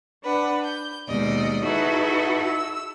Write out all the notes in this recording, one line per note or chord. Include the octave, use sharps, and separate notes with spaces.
D4 B4 F#5
G6
D#2 B2 G#3 D5 D#5
D#4 E4 F#4 G#4 A4 B4
E6